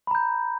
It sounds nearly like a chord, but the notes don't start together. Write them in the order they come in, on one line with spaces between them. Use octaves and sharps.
B5 A#5 G6